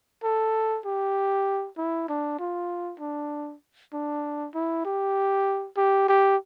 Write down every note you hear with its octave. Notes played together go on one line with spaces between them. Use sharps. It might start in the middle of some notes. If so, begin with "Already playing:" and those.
A4
G4
E4
D4
F4
D4
D4
E4
G4
G4
G4